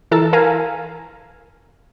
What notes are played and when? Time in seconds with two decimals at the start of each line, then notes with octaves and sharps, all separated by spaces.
0.11 E3 A4 A#4 A5 E6
0.33 A#4 F5 G#5 A#5